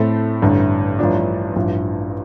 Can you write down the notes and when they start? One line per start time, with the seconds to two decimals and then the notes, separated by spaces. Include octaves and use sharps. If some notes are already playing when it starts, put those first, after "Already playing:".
Already playing: A2 A3 C4 A4
0.42 A1 G2 D3
0.99 A1 G2 F3 D4
1.56 A1 G2 F3